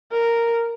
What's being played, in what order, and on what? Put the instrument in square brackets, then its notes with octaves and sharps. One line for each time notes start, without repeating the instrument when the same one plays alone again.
[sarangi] A#4